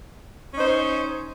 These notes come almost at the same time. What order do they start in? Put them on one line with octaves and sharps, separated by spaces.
C#4 D#4 C5